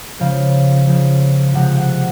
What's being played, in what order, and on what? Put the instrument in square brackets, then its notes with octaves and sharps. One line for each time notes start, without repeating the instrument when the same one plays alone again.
[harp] C#3 F3 G#3 F5
C#3 F3 G#3
C3 F3 G#3 F#5
F#5